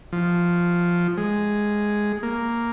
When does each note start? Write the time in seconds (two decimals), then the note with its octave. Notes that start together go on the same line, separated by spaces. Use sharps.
0.12 F3
1.17 G#3
2.23 A#3